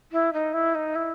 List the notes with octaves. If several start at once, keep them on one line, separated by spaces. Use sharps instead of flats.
E4
D#4
E4
D#4
E4